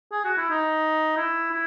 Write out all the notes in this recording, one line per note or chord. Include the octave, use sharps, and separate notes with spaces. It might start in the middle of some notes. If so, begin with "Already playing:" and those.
G#4
F#4
E4
D#4
E4
E4